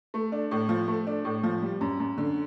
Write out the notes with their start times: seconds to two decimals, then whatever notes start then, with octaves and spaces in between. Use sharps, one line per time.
0.14 A3
0.32 D4
0.51 A2
0.69 F3
0.88 A3
1.07 D4
1.25 A2
1.44 F3
1.62 G3
1.81 F#2
2.00 F#2
2.18 D3